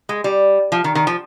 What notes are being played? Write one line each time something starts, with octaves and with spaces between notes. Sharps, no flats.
G#3
G3
F3
D#3
D#3
F3